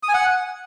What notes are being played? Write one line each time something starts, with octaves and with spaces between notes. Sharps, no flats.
D#6
G#5
F#5